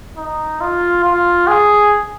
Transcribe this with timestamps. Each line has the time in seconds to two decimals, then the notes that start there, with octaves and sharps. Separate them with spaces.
0.17 D#4
0.61 F4
1.05 F4
1.47 G#4